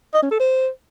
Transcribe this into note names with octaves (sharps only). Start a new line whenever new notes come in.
D#5
C#4
A4
C5